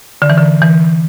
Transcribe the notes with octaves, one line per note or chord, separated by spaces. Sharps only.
D3
E3
D3
E3